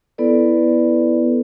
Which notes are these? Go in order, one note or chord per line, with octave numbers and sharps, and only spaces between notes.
B3 E4 A4 B4 D5